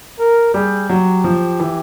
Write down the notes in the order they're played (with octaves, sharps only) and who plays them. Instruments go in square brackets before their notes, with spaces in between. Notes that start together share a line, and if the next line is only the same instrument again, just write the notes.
[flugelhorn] A#4
[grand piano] G3 [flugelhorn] G#4
[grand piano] F#3 [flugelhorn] G4
[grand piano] F3
E3